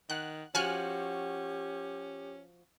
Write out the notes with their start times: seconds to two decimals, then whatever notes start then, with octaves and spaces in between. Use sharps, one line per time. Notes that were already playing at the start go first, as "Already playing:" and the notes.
0.10 D#3 F#5 F#6
0.55 F3 C#4 F#4 G4 G#5 F6 F#6